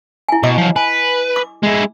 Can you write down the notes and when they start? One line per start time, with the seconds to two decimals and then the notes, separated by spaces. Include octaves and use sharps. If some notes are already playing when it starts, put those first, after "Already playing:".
0.29 E4 G#5
0.43 B2 D#5 D6
0.58 F3 F#3
0.76 B4 G#5
1.36 D6
1.63 G#3 E4